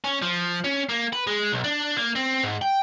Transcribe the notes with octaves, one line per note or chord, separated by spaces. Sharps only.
C#4
F3
C#4
A#3
B4
G#3
B1
D4
A#3
C4
G#2
G5